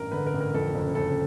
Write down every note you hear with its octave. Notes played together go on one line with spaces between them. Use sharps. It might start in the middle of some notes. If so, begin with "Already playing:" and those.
Already playing: A1 G2 A#4
D3 B4
A#4
A1
A#4
F2 A4
F#1
C#3 A4